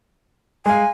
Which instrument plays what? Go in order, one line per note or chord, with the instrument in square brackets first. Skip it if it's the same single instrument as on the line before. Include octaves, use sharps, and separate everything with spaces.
[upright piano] G#3 F5 [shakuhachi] G#5